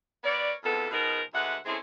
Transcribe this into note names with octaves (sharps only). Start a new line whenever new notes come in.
B3 A#4 C#5 D5
F2 G#2 E3 B3 A4
B2 F3 B3 D#4 G#4 A#4
D2 G#3 B4 E5 F#5
G#3 C4 C#4 E4 G#4 A4